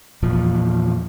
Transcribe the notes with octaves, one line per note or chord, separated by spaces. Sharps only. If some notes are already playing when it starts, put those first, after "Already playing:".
E2 A#2 F3